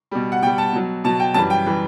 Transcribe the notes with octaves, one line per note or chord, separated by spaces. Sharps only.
B2 G3
F#5
B2 G3 G5
A5
B2 F#3
B2 F#3 A5
G5
F#2 E3 G3 A5
G5
E3 G3